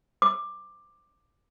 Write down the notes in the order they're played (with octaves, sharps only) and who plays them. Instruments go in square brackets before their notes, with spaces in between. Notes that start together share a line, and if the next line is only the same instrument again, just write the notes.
[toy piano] D6